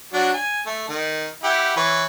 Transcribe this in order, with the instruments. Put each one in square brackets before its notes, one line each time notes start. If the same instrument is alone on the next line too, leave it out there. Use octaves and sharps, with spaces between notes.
[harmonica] F#3 D4 F#4
G#5
A3
D#3
E4 G4 F#5
E3 B4 C#5